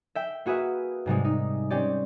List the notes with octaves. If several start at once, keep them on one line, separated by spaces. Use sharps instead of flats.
E5 G5
A#3 F#4 G#4 B4 E5
G#2 C3 G3 G#3
D#4
C4 C#4 G4 D5